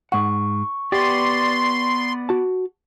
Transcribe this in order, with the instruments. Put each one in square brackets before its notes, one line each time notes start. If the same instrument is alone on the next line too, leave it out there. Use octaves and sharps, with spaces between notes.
[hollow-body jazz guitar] G#2 F#5 [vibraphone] C#6
[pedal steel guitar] B3 D5 [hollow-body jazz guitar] G4 [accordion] C6
[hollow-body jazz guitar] F#4 A5